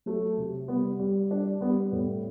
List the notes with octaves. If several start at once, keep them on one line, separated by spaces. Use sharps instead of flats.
F#3 A3
C3
G3 B3
G3
G3 D4
G3 B3
A2 B3